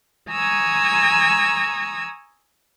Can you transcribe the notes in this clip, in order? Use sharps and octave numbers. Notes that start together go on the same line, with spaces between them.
G#5 A#5 C#6 D#6 E6 G#6